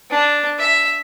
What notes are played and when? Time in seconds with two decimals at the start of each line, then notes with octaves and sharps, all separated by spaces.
0.11 D4
0.59 E5